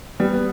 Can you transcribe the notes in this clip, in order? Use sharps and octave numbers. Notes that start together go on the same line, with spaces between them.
G3 B3
B3